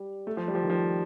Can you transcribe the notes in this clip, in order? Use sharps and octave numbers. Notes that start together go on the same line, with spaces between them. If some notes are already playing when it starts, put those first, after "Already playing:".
Already playing: G3
A3
F3
G3
F3
D#3
F3